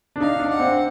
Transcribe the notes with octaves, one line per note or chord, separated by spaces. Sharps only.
D4
D#4 F5
D4
F#5
C4